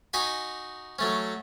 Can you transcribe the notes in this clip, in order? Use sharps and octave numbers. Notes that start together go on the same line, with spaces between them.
D#4 F#4 G#5 B5
F#3 A3 C#4